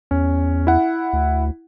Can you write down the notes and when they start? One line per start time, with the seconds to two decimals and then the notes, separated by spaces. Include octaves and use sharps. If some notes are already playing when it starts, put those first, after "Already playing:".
0.11 E2 C#4
0.67 E4 F#5
1.13 D2